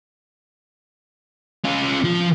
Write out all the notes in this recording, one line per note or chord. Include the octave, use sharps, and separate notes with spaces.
C#4 F4
F3 F4